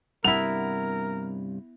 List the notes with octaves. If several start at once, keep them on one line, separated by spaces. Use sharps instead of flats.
G2 C3 B3 E4 A#4 F7